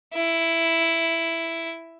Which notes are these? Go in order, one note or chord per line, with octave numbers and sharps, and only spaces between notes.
E4